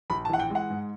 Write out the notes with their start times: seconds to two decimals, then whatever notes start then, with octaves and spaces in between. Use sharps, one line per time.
0.10 A#1 B5
0.25 A5
0.29 E3 F#5
0.39 G5
0.50 G#3
0.55 F#5
0.70 G#2